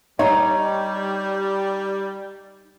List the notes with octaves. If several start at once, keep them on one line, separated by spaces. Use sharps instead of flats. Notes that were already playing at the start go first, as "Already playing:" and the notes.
G3 D#4 C#5